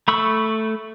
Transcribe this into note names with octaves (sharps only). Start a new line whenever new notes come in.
A3 B5 C#6 E6